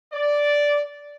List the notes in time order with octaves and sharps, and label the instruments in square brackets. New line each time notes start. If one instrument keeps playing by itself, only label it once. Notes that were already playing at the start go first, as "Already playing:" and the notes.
[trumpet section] D5